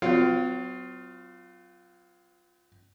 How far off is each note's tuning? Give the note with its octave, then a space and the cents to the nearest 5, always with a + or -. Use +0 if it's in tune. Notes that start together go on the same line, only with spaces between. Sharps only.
F#3 +0 C4 -45 F4 +0